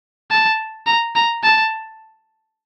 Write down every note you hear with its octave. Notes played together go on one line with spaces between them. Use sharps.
A5
A#5
A#5
A5